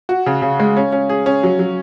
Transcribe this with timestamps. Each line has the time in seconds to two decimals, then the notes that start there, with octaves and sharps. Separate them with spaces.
0.09 F#4
0.26 C#3
0.42 C#3
0.59 G#3
0.77 C#4
0.92 C#4
1.09 G#4
1.26 C#4
1.43 F#3
1.59 F#3